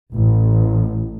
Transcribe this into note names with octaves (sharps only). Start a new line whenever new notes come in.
A1